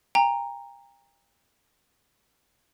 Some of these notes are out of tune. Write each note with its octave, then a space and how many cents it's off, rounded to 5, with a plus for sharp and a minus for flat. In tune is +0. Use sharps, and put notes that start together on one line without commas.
G5 +40 A#5 +0